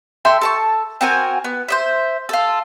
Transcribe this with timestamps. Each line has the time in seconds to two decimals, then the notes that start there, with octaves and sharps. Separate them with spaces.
0.25 A4 E5 G5 C6
0.41 A4 A5 C#6
1.01 C4 F#4 A#4 G#5
1.44 B3
1.68 C5 D#5 E5
2.29 F4 A4